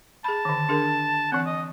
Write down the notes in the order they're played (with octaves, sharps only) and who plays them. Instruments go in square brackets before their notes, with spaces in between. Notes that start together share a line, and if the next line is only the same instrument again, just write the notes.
[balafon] G#4 B5 [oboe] A5
[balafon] D3 D#3
D4 G#4 A#4
[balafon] E3 C4 [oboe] F#5
[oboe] D#5